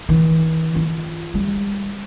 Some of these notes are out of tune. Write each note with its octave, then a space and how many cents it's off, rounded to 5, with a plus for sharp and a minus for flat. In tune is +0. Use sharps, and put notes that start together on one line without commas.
E3 -40
F4 -20
G3 +45